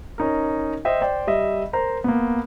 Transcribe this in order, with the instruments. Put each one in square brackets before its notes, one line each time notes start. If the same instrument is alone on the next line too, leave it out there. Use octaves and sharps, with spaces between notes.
[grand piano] C#4 D#4 A#4
C5 D#5 E5 G5
C5 D5 G5
G3 D#5 E5
A#4 C5 A#5
A#3 B3